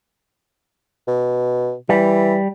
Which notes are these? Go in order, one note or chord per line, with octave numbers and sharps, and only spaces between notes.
B2
E3 G3